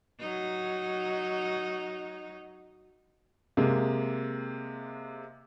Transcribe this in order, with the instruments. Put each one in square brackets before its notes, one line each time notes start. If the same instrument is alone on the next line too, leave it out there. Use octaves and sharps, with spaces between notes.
[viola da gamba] F#3 D#4
[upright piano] C3 G#3 A#3